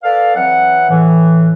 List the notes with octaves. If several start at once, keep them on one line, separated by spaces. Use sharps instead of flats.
A4 B4 D5 F5
E3 F#3 C4 F#5
A2 E3